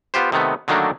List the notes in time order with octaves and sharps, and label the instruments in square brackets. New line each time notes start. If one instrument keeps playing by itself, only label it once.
[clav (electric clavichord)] B3 F4 G4 C5
C3 D#3 A3 B3
D3 D#3 F#3 A3 A#3 D4